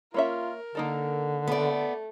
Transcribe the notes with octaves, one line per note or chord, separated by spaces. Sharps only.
A#3 C#4 F4 A#4 E5
D3 A#3 D#4 A4
A3 B3 D5